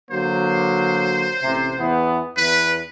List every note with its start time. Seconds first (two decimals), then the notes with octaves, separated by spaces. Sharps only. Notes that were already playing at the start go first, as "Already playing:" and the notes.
0.11 D3 F#3 A#3 C5
1.42 A1 C3
1.78 E2 E3 B3
2.37 E2 B4